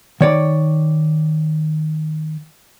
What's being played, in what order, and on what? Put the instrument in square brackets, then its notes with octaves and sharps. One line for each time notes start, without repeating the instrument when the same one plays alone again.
[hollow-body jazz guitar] D#3 C#5 D5